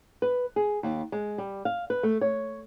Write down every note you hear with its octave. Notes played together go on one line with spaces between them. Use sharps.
B4
G#4
D#2
G#3
G3
F5
B4
A3
C#5